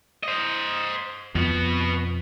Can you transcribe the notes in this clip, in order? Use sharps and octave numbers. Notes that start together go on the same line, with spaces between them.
C5 D#5
F2 B2 F3 B3